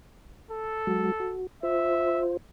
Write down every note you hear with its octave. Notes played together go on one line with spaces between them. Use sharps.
A4
F#3 G#3 F#4
F#4
F4 C5 E5